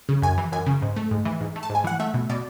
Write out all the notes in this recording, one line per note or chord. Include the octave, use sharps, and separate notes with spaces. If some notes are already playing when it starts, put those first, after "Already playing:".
C#3
F#2 G#5
E3
F#2 G#5
C#3
G#2
A3
G#2
E3
G#2
A3
A5
G#2
G#5
E3 F#5
A3 E5
B2
B2 D5